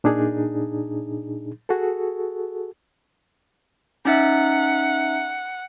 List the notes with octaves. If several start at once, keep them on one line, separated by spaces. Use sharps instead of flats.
A#2 D4 D#4 G#4
F#4 G#4 A4
C#4 D#4 E5 F#5